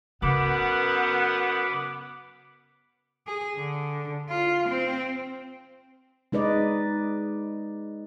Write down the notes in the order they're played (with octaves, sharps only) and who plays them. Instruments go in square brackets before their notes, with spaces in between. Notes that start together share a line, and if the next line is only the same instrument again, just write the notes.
[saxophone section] F#2 B3 [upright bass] C#3 [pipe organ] B5 D6
[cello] G#4
D3
F4
C4
[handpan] G#3 D#4 B4 D5 D#5